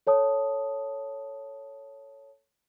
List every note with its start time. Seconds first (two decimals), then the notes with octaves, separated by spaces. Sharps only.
0.07 A4 C#5 A5 D#6